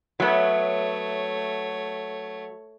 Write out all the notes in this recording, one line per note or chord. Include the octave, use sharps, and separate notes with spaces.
F#3 A3 B3 C#5 E5